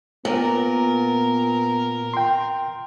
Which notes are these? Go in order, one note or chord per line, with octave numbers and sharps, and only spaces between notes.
A#2 B3 A#4
G5 C6